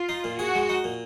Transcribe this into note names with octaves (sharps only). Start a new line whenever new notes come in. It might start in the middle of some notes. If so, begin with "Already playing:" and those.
Already playing: F4
D#4
A#2
F#4 G#4
G#3
D#4
A#2